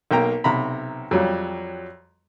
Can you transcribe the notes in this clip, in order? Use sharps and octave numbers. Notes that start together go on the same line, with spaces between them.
B1 A#3 G5 A#5
B1 C3 A#5 B5
F2 F#3 G3